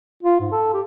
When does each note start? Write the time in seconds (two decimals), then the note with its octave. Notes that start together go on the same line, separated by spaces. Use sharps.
0.23 F4
0.40 G#2
0.52 A4
0.73 G4